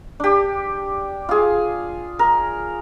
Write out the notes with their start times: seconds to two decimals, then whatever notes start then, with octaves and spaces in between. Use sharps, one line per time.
0.20 D4 G4
1.29 F4 G#4
2.19 A#4